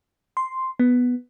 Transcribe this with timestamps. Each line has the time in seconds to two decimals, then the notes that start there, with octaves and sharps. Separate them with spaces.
0.37 C6
0.79 B3